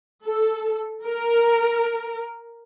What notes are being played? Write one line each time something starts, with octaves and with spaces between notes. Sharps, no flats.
A4
A#4